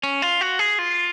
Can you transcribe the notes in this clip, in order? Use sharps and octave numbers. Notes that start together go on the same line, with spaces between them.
C#4
F4
F#4
G#4
F4